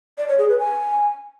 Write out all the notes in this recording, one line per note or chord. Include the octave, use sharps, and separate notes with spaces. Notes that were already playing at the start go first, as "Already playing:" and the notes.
D5
C#5
G#4
B4
G#5